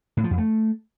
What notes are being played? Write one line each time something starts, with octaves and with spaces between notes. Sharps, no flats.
A2
F3
F2
A3